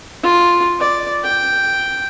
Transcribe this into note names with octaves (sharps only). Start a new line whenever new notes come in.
F4
D5
G5